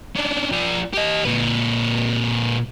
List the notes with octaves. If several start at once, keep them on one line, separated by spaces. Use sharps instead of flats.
C#4 D4
F3 D5
G4 D#5
A#2 B4